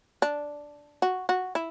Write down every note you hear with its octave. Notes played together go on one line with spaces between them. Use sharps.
D4
F#4
F#4
E4